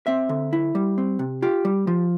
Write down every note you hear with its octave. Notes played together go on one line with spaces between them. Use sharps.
C4 E5
D3
E4
G3
C4
C3
F4 G4
G3
F3